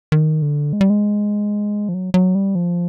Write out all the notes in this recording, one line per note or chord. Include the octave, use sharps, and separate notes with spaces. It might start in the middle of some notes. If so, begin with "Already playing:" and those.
D#3
D3
G#3
G3
G#3
F3
F#3
F#3
G3
F3